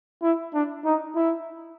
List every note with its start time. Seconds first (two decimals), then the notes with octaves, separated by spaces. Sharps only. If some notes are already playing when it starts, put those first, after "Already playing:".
0.22 E4
0.54 D4
0.85 D#4
1.16 E4